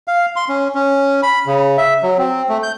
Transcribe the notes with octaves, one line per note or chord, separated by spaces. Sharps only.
F5
C6
C#4
C#4
B5
C#3
E5
F#3
C4
A3
G6